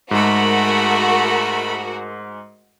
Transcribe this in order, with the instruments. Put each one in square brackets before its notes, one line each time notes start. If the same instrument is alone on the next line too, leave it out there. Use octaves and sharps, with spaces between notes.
[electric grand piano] G#2 G#3 [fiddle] A3 B5 [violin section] F#4 A#4